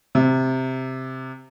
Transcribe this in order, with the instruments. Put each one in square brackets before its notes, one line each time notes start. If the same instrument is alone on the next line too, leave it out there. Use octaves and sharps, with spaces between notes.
[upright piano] C3